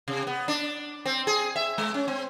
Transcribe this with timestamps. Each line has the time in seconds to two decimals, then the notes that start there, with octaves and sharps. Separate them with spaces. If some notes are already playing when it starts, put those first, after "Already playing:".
0.08 C3
0.27 B3
0.48 D4
1.06 C4
1.27 G#4
1.56 E5
1.78 G#3
1.94 C#4
2.08 C4